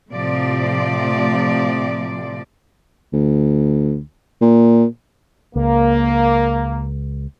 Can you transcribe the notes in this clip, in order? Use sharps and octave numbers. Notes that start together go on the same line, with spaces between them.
A2 C3 F3 A3 D5
D2
A#2
C#2 A#3